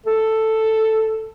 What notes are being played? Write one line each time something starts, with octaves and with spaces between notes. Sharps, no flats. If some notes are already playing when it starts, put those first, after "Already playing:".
A4